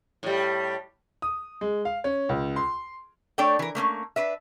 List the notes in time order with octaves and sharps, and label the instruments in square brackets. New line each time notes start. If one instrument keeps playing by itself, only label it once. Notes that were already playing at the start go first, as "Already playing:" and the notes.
[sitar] A2 G3
[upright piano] D#6
G#3
F5
C#4
C#2
C6
[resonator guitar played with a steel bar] A3 D4 A4 C#5 D5 G5
E3 A#4
A3 A#3 C4 C#4
D4 B4 E5